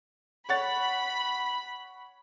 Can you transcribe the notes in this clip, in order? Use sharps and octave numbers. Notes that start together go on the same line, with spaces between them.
C#5 F#5 B5 A6